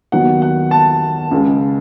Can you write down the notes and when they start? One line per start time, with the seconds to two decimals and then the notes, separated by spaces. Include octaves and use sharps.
0.12 D#2 D#3 F#3 B3 F#5
0.42 F#5
0.71 A5
1.31 C#2 C#3 G#3